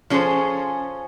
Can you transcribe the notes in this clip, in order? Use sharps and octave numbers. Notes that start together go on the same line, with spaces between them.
F3 C#4 G#4 A4 C5